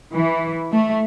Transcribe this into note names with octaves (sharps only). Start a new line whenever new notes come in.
E3
A3